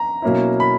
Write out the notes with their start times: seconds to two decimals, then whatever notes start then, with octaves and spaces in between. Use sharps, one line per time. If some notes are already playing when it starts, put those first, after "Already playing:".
Already playing: A#5
0.22 B2 F#3 A#3 C#4 E4
0.60 B5